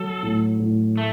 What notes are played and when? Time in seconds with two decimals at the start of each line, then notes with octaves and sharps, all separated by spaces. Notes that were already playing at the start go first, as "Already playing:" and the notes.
Already playing: F#3 A4
0.23 A2
0.60 A2
0.97 A3